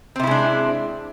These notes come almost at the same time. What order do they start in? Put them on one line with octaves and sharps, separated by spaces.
C4 C3 E4 G#3 D4